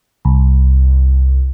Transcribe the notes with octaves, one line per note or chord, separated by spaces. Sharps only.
C2